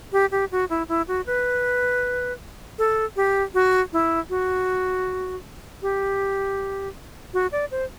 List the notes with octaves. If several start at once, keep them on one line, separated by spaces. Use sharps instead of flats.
G4
G4
F#4
E4
E4
F#4
B4
A4
G4
F#4
E4
F#4
G4
F#4
D5
C5